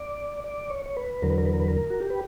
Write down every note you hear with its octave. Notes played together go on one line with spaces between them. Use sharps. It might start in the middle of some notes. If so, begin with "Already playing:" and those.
Already playing: D5
D5
C#5
C#5
B4
E2 D3 F#3 A#4
B4
A#4
B4
A#4
B4
A#4
F#4
G4
B4